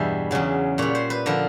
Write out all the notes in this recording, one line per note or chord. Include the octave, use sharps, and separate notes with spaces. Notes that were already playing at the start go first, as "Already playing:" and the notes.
Already playing: E2 G2 B2 E3 G3 E5
E2 C#3 F#3
A#2 G3 C#5
C5
B4
D3 F3 A#4